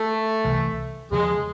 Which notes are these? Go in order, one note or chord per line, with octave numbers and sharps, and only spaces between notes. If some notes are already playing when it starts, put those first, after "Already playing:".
Already playing: A3
C2 C3 E3
E2 C#3 F3 G#3